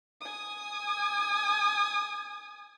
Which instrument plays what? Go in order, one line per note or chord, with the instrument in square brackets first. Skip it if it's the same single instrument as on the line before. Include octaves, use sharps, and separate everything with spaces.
[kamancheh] G#5 D#6